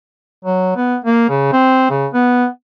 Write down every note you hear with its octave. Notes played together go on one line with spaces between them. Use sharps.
F#3
B3
A#3
C#3
C4
C#3
B3